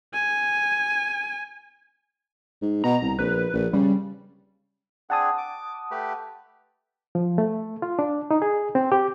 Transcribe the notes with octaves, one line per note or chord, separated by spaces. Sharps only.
G#5
G#2
B2 A#5
C2
A#1 B4
A#1
C#3 G3
C4 D4 G#4 F#5 A5 D#6
D6
A3 G4 B4
F3
A3
F4
D4
D#4
G#4
C4
G4